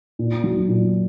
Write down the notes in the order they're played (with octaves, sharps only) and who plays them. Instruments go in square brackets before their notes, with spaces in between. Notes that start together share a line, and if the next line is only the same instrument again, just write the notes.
[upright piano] A#2
F#3
A#2